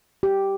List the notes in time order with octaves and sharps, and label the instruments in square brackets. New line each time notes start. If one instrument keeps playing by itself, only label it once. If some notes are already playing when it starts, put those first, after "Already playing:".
[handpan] G4